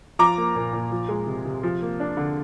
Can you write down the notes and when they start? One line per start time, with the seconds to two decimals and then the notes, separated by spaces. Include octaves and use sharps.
0.19 F3 A#5 D6
0.38 A#3
0.55 A#2
0.73 A#2
0.92 F3
1.09 G#3
1.27 C3
1.45 C3
1.63 F3
1.82 A#3
2.00 D4
2.17 D3